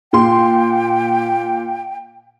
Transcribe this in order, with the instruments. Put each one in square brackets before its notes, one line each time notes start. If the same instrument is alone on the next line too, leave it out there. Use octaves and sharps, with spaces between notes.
[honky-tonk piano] A#2 C6 [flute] G5